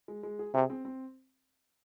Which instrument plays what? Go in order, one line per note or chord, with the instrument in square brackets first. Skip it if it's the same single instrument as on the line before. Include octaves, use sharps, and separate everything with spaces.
[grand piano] G#3
G#3
G#4
[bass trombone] C3 [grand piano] G#4
[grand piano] C4
C4